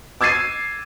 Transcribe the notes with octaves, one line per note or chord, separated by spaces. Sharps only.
D6 E6 G#6 A6 C7 D#7